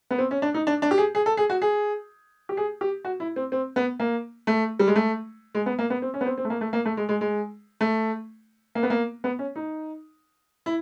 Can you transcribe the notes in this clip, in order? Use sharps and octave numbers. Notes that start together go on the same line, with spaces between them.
B3
C4
C#4
D4
D#4
D4
D4
G4
G#4
G#4
A4
G#4
F#4
G#4
G4
G#4
G4
F#4
E4
C4
C4
B3
A#3
A3
G3
G#3
A3
G#3
B3
A#3
B3
C4
C#4
B3
C4
C4
A3
A#3
A3
A#3
A3
G#3
G#3
G#3
A3
A#3
B3
A#3
B3
C#4
D#4
E4